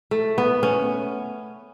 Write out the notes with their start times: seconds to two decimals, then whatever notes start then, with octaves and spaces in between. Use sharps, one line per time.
0.11 A3
0.38 B3
0.63 C#4